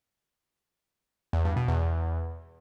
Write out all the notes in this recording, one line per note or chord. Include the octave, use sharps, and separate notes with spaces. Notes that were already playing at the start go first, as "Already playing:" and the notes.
E2
G2
B2
E2